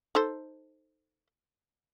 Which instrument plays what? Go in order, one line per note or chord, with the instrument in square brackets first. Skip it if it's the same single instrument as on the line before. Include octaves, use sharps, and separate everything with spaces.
[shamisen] D#4 A4 C5